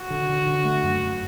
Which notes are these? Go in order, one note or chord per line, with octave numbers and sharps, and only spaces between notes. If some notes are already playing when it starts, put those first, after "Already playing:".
Already playing: F#4
D3
D3
D3
A3
F#2
F#2